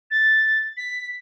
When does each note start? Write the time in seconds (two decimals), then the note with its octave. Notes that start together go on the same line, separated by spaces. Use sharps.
0.11 A6
0.77 B6